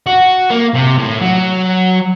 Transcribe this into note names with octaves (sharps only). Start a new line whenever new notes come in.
F#4
A#3
C3
A2
F#3